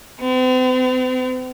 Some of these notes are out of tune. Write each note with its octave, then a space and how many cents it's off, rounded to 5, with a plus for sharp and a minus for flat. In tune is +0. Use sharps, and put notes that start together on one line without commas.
C4 -45